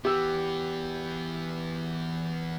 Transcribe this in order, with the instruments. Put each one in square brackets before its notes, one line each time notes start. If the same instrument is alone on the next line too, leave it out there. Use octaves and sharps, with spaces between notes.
[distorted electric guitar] E3 B3 [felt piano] G4 E6